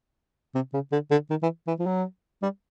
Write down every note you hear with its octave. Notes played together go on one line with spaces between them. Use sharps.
C3
C#3
D3
D3
D#3
E3
E3
F3
F#3
G3